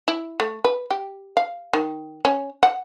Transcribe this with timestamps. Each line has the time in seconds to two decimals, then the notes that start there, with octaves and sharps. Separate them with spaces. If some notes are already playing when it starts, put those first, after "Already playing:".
0.08 E4
0.40 A3
0.64 B4
0.91 G4
1.37 F5
1.73 D#3
2.25 C#4
2.63 F#5